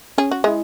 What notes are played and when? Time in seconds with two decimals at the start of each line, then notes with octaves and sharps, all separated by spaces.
0.18 C#4 G#4
0.31 F#4
0.44 G#3 E4 G#4